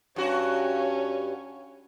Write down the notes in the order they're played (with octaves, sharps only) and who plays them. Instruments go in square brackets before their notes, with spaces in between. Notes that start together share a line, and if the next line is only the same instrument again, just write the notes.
[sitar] G2 F#4 [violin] C#4